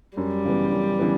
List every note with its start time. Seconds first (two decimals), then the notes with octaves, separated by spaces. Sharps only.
0.17 F#2 G3
0.45 C#3 E3 B3
0.72 F#2
0.99 C#3 E3 B3